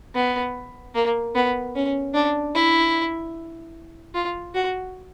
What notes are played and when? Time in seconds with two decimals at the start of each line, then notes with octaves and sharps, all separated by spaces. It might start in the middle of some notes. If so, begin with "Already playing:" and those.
0.15 B3
0.95 A#3
1.36 B3
1.76 C#4
2.15 D4
2.55 E4
4.15 F4
4.54 F#4